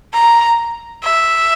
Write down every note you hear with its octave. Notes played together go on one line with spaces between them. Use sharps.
A#5
E5